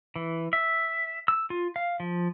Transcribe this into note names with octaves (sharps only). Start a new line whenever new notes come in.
E3
E5
E6
F4
F5
F3